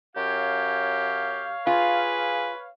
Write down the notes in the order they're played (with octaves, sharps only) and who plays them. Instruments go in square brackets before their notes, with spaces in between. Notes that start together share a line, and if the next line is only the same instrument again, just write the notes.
[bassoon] F#2 [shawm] G4 [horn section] C#5 F5
[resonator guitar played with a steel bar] F4 [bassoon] G#4 [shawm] B4